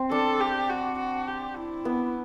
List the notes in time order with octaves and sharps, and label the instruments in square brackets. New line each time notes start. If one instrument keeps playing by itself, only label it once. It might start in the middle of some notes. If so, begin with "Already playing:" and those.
Already playing: [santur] C4
[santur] D4 [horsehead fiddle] A4
[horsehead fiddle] G4
F#4
F#4
G4
E4
[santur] B3